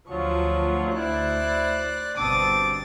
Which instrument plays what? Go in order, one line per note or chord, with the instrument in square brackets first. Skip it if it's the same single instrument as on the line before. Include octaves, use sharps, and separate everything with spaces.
[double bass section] D2 [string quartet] F3 D4 C#6 [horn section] F#3 F4
[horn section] E4 [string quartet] C5 D5 F#6
[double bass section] G1 B2 [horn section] C4 D4 [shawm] D6 [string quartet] D#6 A6